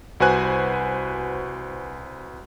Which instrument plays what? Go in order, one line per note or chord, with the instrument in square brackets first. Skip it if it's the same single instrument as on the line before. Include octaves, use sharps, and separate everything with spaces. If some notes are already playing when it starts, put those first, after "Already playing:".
[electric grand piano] C2 F#4 B4 C5 G#5 F#6